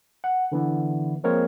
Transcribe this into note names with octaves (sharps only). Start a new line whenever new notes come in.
F#5
D3 E3 B3
F3 G#3 A#3 C4 A#4 C#5